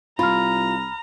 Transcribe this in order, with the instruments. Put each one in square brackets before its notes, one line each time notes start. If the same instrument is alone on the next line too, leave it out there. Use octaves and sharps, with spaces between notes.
[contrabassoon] C2 [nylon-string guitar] F4 [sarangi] A#5 [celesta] B5 F6